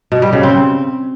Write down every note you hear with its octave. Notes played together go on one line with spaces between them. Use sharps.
B2
G3
C#3
C4